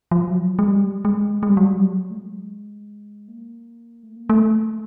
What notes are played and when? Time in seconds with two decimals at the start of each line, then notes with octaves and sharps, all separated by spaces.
0.11 F3
0.31 F#3
0.59 G#3
0.67 G3
1.05 G#3
1.43 G#3
1.49 G3
1.57 F#3
1.65 G3
1.79 F#3
2.11 A3
2.17 G#3
3.28 A#3
4.03 A3
4.16 A#3
4.30 A3